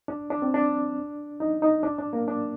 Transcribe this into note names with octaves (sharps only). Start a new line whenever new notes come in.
D4
D4
C4
D4
D#4
D#4
D4
D4
A#3
D4